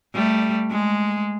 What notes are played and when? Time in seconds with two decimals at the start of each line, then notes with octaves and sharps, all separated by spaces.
0.14 G3 A3
0.71 G#3